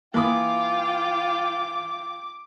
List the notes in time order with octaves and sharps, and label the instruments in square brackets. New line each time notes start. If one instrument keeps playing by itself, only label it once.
[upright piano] E3 B5 [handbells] A#3 A5 D#6 [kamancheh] F4 G5 [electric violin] D6